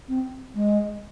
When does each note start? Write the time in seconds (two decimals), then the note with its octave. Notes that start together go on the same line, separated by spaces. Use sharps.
0.08 C4
0.55 G#3